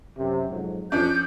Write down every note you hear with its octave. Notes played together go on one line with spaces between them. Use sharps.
F#2 C3
F2 G#2 F#3
F2 F3 C#4 D4 G6